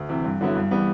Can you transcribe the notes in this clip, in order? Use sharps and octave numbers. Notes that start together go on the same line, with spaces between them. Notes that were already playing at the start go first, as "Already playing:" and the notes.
Already playing: D2
C3 E3
G2
D3 F#3 B3 E4
G2
E3 G3 B3